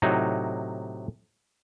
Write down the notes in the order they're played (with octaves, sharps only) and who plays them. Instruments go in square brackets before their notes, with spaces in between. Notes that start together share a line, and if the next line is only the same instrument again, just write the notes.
[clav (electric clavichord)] A2 C3 F#3 D#4